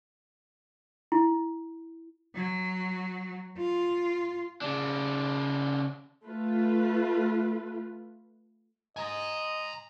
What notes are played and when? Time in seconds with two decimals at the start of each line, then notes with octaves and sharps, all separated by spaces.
1.12 E4
2.35 F#3
3.58 F4
4.62 C#3 D4
6.25 A3 F4 B4
8.97 D#5 G#5 A#5